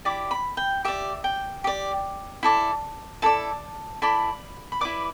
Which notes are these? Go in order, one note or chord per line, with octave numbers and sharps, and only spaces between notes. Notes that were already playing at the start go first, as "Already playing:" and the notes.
E4 G4 D5 D6
B5
G5
G4 D5 E5
G5
G4 D5
E4 A4 D5
E4 A4 D5 A5
E4 A4 D5 B5
B5
E4 B4 D5 D6